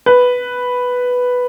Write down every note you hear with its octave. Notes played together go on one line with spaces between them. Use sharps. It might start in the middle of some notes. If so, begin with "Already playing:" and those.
B4